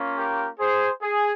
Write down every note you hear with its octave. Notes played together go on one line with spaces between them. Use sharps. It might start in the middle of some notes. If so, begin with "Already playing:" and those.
Already playing: A#3 C#4 F4
G4 A#4
G#4 C5
G#4